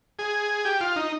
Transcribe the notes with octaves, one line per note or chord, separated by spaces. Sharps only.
G#4
G4
F4
D#4